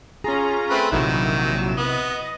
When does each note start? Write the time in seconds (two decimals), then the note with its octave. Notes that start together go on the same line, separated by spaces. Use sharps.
0.24 C#4 F4 G#4 A#5
0.70 A3 C4 B4
0.92 A#1 C3 D#3 F#3 E4 E7
1.77 B3 D#5